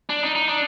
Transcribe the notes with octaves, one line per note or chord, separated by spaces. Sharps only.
D4
D#4
D#4
D4